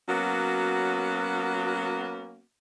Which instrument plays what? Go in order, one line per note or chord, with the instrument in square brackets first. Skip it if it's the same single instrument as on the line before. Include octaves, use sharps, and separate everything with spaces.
[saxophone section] F#3 A#3 B3 C#4 F#4